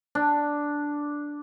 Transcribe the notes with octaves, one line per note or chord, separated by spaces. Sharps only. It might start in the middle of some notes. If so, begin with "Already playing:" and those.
D4